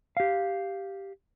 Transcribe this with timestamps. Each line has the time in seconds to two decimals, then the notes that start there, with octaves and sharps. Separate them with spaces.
0.17 G4 F5